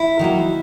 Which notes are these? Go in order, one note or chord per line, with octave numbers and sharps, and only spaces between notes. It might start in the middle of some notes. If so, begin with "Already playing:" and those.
Already playing: E4
D#3 F#3 A#3